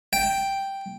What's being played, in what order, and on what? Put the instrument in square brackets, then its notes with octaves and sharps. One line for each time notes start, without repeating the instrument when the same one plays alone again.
[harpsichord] G5